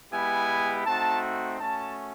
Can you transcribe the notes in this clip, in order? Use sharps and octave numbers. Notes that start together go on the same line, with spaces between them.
G#3 B3 E4 G4 G#5
A3 C4 D#4 F#4 A5
A3 C#4 F#4 A5